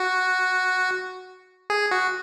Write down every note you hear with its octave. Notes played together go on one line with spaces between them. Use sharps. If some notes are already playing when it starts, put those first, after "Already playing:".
Already playing: F#4
G#4
F#4